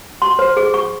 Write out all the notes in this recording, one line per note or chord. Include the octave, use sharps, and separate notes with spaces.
C6
C5
G#4
C#6